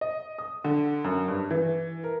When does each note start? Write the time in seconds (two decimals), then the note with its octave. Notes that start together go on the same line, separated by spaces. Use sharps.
0.01 D#5
0.38 D#6
0.64 D3
1.04 F#2
1.28 G2
1.51 E3
2.04 A#4